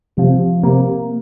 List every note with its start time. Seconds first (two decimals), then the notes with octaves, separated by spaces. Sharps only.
0.17 C3 F3
0.63 C3 A#3